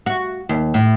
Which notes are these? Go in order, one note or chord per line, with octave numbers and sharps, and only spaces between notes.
F#4
D#2
A2